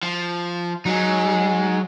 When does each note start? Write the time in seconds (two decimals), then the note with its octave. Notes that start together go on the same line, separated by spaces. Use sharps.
0.03 F3
0.86 F#3 G#3 D#4